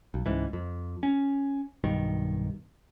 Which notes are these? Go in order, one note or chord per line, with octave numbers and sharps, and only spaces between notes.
B1
C#2 G#2 E3
F2
C#4
B1 G2 D#3